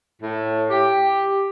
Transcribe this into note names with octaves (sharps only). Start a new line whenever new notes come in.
A2
G4